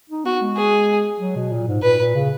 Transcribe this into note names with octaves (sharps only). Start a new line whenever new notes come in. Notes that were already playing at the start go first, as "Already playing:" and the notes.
D#4
B3 F#4
G#3
G#4
F#3
B2
A#2
G#2
A#2 B4
A#2
C#3